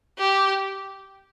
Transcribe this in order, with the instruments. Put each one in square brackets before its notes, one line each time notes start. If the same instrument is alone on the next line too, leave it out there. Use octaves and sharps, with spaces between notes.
[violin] G4